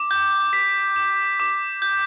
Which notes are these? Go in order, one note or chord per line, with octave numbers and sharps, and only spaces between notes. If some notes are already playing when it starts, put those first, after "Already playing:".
Already playing: D6
G6
B6
D6
D6
G6